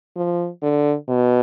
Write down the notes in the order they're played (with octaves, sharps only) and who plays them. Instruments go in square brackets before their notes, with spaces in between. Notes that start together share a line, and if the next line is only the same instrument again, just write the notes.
[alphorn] F3
D3
B2